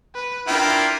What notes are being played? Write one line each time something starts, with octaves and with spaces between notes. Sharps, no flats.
B4
D4 E4 F4 A#4 G5